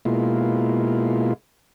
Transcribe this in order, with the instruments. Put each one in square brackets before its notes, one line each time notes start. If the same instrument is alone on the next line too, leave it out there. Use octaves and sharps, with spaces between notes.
[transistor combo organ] B2 G#3 A#3 E4 F4